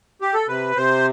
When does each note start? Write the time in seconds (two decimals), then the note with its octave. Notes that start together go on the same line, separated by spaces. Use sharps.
0.22 G4
0.34 A4
0.47 C3 B4
0.76 C3 C5